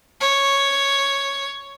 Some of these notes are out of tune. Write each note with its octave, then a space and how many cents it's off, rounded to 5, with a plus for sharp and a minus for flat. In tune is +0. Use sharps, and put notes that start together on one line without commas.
C#5 +0